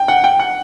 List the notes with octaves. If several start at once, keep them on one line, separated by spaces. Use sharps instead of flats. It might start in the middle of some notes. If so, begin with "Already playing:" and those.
Already playing: G5
F#5
G5
F#5